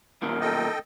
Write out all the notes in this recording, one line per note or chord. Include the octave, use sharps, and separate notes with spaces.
B1 A#2 D#3
A4 D#5 G5